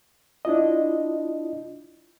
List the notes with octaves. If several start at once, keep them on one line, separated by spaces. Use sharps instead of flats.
D4 E4 F4 D#5